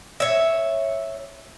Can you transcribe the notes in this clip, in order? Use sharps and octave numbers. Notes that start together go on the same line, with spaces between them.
C#5 E5